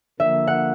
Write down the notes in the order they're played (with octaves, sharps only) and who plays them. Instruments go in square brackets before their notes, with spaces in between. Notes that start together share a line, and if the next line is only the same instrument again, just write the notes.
[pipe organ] D3 F3 A#3 [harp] E5
[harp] F#5